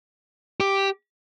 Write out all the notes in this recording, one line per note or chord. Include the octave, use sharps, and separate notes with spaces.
G4